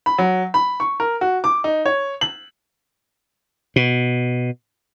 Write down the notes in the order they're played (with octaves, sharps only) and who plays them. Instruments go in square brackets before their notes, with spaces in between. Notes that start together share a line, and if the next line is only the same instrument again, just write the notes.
[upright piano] B5
F#3
B5
C#6
A#4
F#4
D6
D#4
C#5
F#7
[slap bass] B2